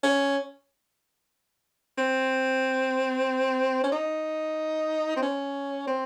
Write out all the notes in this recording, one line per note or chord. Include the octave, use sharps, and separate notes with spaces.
C#4
C4
C#4
D#4
C4
C#4
C4